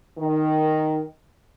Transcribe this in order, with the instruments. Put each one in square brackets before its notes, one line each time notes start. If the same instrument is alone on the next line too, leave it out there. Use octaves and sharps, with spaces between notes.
[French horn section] D#3